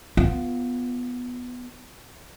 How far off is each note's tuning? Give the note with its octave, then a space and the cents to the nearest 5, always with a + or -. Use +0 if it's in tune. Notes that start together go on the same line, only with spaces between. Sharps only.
B3 +0 F4 +0